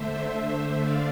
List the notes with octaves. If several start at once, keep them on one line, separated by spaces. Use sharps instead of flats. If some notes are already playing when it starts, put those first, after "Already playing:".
Already playing: D3 A3 C5 E5
C5 E5
D5 F5